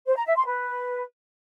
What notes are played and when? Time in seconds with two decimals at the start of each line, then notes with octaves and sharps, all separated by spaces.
0.06 C5
0.16 A#5
0.26 E5
0.36 C6
0.46 B4